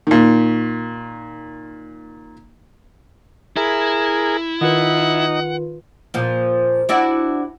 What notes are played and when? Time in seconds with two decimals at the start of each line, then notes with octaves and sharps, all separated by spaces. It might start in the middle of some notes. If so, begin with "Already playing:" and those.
0.07 A#2 D#3
3.56 E4 G#4 A#4
4.61 D#3 D#4 F4 B4 F#5
6.14 A#2 F3
6.89 D4 E4 F#4